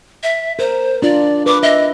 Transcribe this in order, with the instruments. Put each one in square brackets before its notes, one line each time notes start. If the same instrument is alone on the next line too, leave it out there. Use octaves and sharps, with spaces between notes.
[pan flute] E5
[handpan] A#4 [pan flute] C5
[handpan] D4 F4 [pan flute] D5
[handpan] B4 [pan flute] D6
[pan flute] D#5 [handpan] E5